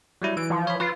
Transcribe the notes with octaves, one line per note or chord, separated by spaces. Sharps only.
F#3 G3 E4
E3 D7
F3
C#5 B5
F4 B4